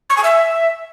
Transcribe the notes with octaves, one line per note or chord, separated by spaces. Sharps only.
C#6
G#5
E5